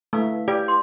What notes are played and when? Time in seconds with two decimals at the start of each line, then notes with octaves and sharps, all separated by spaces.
0.13 A3 E4 B4 F5
0.48 G4 D5
0.68 C6 D6